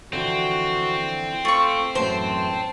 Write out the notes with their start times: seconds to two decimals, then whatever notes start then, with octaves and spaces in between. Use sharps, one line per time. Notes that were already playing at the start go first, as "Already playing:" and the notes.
0.13 D3 E3 F3 C4 F#4
1.45 A3 F4 C#6
1.95 F#2 A2 E3 C5 A5